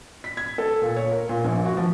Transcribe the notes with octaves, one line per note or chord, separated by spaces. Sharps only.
B6
G#6
A4
A#2
C#5
A#4
A#2
A#1
F#4
F3